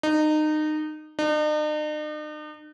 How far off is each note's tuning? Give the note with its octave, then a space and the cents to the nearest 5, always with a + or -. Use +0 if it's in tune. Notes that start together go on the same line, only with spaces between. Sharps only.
D#4 -25
D#4 -45